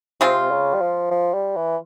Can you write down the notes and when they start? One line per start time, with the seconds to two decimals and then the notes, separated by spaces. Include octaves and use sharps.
0.20 C3 G#3 C4 F4
0.51 C#3
0.74 G3
0.81 F3
1.11 F3
1.34 G3
1.56 E3